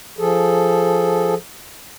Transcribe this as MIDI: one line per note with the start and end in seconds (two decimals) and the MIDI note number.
0.18 1.34 53
0.18 1.34 68
0.18 1.34 69